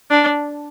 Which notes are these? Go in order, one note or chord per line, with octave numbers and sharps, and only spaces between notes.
D4